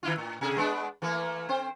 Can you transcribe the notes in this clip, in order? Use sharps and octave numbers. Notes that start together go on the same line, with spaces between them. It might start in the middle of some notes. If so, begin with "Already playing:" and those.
D#3 E4 F4
A2
C3 G#4 A4
G#3 B3 D4
E3 A3 A#3
C4 C5